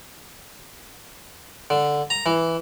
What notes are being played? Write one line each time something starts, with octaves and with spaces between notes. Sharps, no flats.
D3
A#5
E3